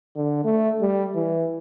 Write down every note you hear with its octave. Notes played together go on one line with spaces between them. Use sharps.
D3
A3
G3
E3